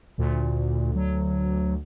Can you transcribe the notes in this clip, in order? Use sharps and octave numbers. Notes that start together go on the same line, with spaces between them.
D2 A#2
F#3